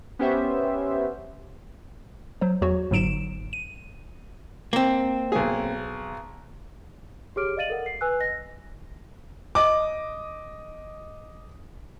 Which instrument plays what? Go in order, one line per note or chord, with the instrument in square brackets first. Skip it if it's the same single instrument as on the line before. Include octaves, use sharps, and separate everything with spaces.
[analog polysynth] B3 C#4 G4 C5 E5
[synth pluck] F#3 C5
E2 F#3 F#4 C#5
G1 G#2 F#3 D7 E7
D#7
[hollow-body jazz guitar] A#3 C4
[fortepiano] B1 G#4
[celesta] G4 G#4 C#5 D6 F6 D7
D5 D#5 F5 A6 D#7 F#7
A4 A#4 F#5
C7
B4 G#5 E6 F#6
D#5 A#6
[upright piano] D#5 D6